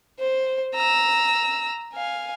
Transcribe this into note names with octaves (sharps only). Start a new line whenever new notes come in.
C5
A#5 E6
F5 G#5